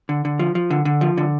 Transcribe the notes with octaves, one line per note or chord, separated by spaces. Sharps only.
D3
D3
F3
F3
D3
D3
F3
D3